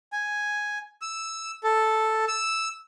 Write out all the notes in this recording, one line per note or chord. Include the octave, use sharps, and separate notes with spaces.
G#5
E6
A4
E6